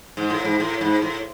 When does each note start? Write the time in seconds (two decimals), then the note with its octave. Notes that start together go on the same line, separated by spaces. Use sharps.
0.17 G#2
0.30 A2
0.45 G#2
0.60 A2
0.81 G#2
1.02 A2